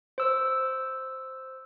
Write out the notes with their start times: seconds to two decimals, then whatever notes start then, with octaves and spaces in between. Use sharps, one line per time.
0.18 C5 E6